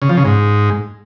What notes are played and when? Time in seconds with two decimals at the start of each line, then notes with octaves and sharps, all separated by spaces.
0.02 C#3
0.09 F3
0.17 C#3
0.25 G#2